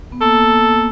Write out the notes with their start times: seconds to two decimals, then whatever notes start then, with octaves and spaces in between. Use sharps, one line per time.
0.12 B3
0.21 A#3 A4